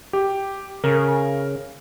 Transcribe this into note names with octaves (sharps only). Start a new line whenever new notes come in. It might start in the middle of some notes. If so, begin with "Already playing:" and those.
G4
C#3 A#4